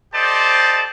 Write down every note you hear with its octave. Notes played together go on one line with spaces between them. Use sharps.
G4 A4 C5 D5 D#5 A5